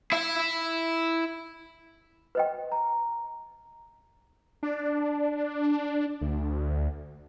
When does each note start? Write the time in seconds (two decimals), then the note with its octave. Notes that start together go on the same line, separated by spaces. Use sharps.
0.12 E4 E5
2.35 B4 D#5 G5
2.72 A#5
4.63 D4
6.21 D2